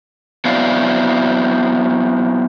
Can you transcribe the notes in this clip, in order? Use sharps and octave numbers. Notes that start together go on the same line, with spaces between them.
F#3 B3 C4 E4 D5 F5